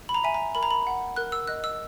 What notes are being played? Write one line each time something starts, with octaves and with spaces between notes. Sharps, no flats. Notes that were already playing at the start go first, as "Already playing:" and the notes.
B5
A#5
E5 G#5
A#5
A#4 B5
A#5
B5
F#5
A#4 F#6
E6
D#5 F#6
E6